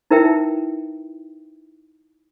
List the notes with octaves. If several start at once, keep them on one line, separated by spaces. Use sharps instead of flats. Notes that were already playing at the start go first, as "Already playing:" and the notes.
D#4 E4 A#4 B4 E5 G5